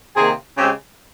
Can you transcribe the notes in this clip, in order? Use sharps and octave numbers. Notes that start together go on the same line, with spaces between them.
C3 D#3 A#3 G#4
C#3 G#3 C4 G4